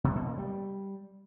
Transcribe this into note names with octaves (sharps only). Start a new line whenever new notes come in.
C3
B2
A#3
G3